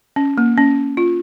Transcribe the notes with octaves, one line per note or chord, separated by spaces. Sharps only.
C#4
A#3
C#4
F4